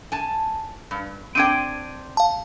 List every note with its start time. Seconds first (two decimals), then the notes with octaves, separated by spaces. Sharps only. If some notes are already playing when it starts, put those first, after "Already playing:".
0.12 G#5 A5
0.91 G2
1.35 C4 D4 G5 G#6 D7 D#7
2.17 F5 A5